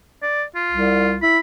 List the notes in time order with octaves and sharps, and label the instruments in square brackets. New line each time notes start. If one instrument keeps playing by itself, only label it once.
[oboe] D5
F4
[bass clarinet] C2
[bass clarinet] E4 [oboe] B5